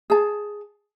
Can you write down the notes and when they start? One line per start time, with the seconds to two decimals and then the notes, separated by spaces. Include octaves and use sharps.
0.10 G#4 A5